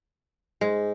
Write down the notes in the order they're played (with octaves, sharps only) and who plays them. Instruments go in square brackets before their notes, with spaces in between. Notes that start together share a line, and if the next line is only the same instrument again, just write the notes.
[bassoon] G#2 [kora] G#3